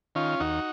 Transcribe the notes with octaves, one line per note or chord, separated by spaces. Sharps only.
D#3 C#4 F4
D#2 D#4 F#4